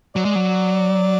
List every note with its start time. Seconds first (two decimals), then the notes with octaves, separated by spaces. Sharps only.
0.15 F#3 D5
0.25 G#3
0.35 F#3